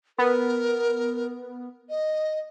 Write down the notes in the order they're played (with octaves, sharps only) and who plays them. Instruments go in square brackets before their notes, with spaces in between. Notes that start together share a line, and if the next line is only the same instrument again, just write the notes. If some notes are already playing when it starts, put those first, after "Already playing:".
[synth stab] B3 [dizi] A#4
[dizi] D#5